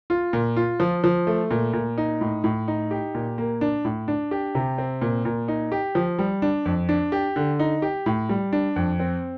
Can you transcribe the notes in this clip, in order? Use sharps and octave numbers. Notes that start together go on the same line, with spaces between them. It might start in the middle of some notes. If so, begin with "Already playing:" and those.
F4
A#2
F4
F3
F3
A3
A#2
A#2
D#4
A2
A2
D#4
G4
A#2
A#3
D4
A2
D4
G4
C3
C4
A#2
A#2
D#4
G4
F3
G3
D4
F2
D4
G4
D3
D#4
G4
A2
G3
D4
F2
C4